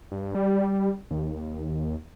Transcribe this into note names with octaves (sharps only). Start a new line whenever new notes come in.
G2
G3
D#2